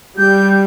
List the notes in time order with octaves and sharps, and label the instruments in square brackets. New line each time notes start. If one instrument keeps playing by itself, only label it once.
[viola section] G3 [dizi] G6